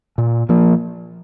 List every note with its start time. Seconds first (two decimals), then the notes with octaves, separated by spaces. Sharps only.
0.18 A#2
0.49 F3 A#3